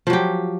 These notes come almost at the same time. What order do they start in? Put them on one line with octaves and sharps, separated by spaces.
F3 F#3 G4